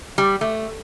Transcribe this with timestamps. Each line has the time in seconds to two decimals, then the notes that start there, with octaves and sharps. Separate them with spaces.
0.18 G3
0.41 A3